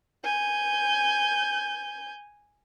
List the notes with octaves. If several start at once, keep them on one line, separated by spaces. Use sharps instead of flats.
G#5 G6